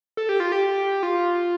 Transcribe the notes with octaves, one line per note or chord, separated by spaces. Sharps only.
A4
G4
F4
G4
F4